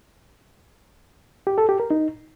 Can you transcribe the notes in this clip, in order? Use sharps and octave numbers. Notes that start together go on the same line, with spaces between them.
G4
A4
G4
A#4
D#4